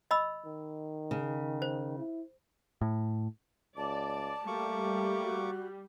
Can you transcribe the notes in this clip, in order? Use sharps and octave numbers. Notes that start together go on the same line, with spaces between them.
D#5 B5 E6
D#3
C#3
C5
E4
A2
C#2 D5 A5
G3 A3 A#3 C#6 D6
F#4